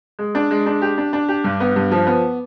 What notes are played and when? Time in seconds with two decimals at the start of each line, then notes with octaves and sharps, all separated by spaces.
0.19 G#3
0.35 D4
0.51 G#3
0.66 D4
0.82 G4
0.98 D4
1.13 D4
1.28 G4
1.44 G2
1.60 B3
1.76 G2
1.92 F3
2.07 B3